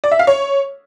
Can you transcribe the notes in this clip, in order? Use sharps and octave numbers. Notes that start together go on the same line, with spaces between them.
D5
E5
F5
C#5